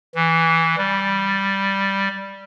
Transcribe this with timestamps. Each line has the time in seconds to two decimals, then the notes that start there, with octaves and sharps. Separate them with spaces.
0.15 E3
0.78 G3